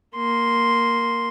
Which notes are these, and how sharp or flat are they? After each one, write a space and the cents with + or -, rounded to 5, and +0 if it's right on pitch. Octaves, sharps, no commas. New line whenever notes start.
A#3 +0 C6 +0